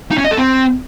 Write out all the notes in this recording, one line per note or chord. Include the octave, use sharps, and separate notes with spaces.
D#4
C#4
D#5
A4
C4